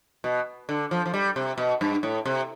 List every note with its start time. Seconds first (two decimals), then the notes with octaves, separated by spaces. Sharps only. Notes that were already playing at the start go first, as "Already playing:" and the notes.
0.24 B2
0.69 D3
0.91 F3
1.06 F3
1.14 G3
1.36 C3
1.58 B2
1.81 G2
2.03 A2
2.25 C3